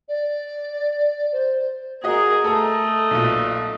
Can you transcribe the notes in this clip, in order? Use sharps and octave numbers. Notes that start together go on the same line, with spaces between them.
D5
C5
F#4 G#4 A#4 D#5
A3 A4 D#5 A#5
B1 A#2